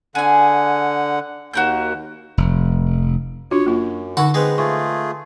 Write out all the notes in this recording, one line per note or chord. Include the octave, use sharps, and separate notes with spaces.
D3 G#4 F#5 G#5
D#2 F#4 A#4 G6
F1
D4 F4 F#4 C#5
F#2 A#3 F4
D3 D#4 F#4 A4 F#5 C#6
G#3 B3 C4 B4
A3 F4 G#4 C#6